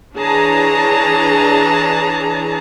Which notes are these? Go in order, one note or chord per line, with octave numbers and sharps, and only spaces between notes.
E3 D4 G#4 C#5 A5 A#5